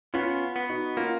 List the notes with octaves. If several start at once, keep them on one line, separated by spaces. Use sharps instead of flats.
B3 C#4 F4
B3
D#4 F#4
A#3 C#4 F4